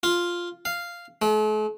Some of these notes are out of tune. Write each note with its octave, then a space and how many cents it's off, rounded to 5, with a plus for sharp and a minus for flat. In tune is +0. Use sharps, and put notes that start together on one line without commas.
F4 +0
F5 -5
A3 -45